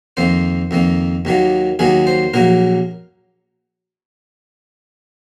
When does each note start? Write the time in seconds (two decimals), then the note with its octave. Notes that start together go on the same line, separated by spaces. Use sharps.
0.17 F2 D#3 A#3 C5
0.71 F2 D#3 A#3
1.25 D#2 D#3 F#3 A#3
1.79 D#2 D#3 F#3 A#3 G#4
2.07 C5
2.34 A#1 A#2 F#3 A#3 A#4